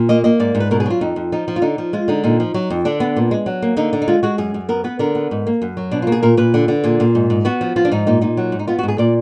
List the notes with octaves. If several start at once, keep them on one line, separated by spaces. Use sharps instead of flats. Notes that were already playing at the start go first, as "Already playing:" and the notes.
Already playing: A#2
A#3 D#5
A#3 D#5
G#2 D5
G#2
B4
B2 A#4
G#4
F#3 F4
F2 D#4
F2
F3 D#4
F3
F4
D3 D#4
F3
G#3 F4
D3 D#4
A#2 D#4
F3
F#3
F2
D3 D4
B3
A#2
G#3
F#3
A#3
D3 D#4
D3
D#4
G#3 F4
G#3 F#4
F#2 G#4
F#2
B3 A#4
B3 B4
D3 A#4
B3
G#2
A#3
F#2
F#3
B2 D4
F4
A#3
G#4
A#2 A#4
A#2 B4
D3
D3
A#2 G#4
A#2
G#2
G#2
B3 F#4
F3
F3 F4
D4
G#2 D#4
A#2 D#4
A#2 D#4
F#3
G#2
D#4
B3 F4
F#4
G#2
G#4
A#2 D5